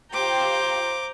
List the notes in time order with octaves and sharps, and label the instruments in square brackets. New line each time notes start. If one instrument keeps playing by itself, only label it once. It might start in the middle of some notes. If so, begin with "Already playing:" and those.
[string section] F4 G4 [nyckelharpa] C5 [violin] A#5 G6 [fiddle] D6